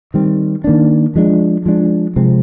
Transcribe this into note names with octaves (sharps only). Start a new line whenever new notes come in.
D#3 G3 C4
D#3 A#3 D4
F3 G#3 D4
F3 G#3 D4
C3 F3 G#3 C4